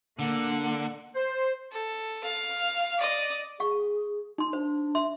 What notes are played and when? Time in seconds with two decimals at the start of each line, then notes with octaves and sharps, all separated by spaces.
0.19 D3 A#3 F#5
1.15 C5
1.72 A4
2.24 F5
2.98 D5 D#5
3.60 G#4 F5 C#6
4.38 D#4 C6
4.53 D4 C5
4.95 E5 C6